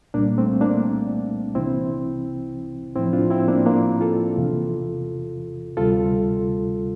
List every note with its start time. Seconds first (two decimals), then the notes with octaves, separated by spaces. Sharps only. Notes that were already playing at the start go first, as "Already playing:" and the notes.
0.14 C2 A#2 G3 A#3 D4
0.37 A3 C4
0.61 A#3 D4
1.55 C2 C3 E3 C4 E4
2.95 A2 F3 C4 E4
3.13 D4 F4
3.30 C4 E4
3.48 A#3 D4
3.66 A#3 D4
4.01 F4 A4
4.37 E2 C3 E3
5.77 D2 C3 G3 F4 A4